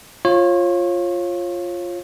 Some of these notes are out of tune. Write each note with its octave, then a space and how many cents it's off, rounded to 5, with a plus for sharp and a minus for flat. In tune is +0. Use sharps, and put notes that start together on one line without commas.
F4 +0 C#5 -30